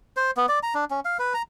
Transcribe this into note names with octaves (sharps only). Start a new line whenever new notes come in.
C5
B3
D5
A#5
D4
C#4
F5
B4
A#5